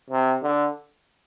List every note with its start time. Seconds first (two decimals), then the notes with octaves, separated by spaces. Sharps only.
0.10 C3
0.43 D3